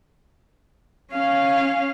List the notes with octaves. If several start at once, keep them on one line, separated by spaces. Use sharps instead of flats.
C#4 F5